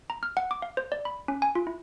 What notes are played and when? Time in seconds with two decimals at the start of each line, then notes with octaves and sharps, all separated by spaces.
0.10 A#5
0.23 F6
0.37 F#5
0.51 D6
0.62 F5
0.77 C5
0.92 D5
1.05 B5
1.28 C#4
1.42 G#5
1.55 F4
1.67 E4